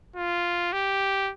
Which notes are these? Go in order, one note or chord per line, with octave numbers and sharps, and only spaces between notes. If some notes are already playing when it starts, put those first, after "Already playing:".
F4
G4